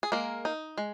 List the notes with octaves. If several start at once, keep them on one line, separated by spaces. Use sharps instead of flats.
G#4
G#3 A#3 A#4
D#4
G#3